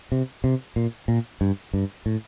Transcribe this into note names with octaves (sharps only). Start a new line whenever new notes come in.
C3
C3
A#2
A#2
G2
G2
A2